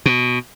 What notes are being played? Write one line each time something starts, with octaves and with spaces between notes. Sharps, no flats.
B2